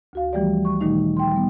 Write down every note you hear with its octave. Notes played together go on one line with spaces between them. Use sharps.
D2 F#4 F5
E3 F3 G3 A3 G4 D5
C#6
A#2 D#3 G3 A3 D#4
G5 C6
G3 B3